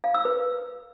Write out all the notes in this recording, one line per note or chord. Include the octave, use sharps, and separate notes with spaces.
F5
E6
B4